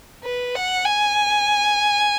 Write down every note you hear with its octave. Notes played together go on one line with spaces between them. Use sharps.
B4
F#5
G#5